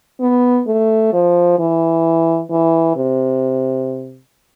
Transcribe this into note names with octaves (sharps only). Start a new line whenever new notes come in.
B3
A3
F3
E3
E3
C3